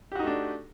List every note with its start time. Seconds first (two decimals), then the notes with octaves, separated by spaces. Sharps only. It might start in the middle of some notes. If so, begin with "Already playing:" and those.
0.12 G4
0.15 F#4
0.19 D#4
0.23 A3
0.27 D4